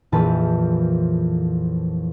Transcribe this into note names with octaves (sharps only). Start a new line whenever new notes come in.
A#1 F2 A#2 E3 B4 A5